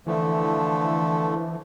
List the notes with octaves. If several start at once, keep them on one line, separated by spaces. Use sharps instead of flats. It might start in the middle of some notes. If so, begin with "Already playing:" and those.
D3 E3 F3 A3